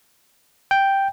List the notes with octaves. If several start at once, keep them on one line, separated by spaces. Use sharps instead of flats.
G5